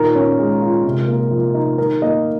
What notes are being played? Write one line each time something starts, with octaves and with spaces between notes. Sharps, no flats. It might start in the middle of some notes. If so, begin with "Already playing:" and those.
Already playing: A#2 D#3 A#4
C#4
G#3
F4
C3
A#3
F3
D#4
D#3 A#4
A#3 D#5